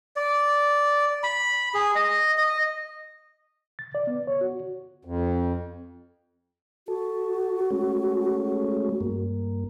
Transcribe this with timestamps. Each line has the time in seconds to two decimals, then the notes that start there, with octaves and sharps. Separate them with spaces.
0.16 D5
1.23 B5
1.74 G#4
1.95 D#5
2.38 D#5
3.79 A6
3.95 D5
4.07 B3
4.27 C#5
4.41 F#4
5.05 F2
6.88 F#4 A4
7.70 G#3 A3 C#4
9.01 G2 A#3